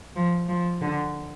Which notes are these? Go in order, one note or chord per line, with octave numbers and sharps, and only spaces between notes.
F3
F3
D3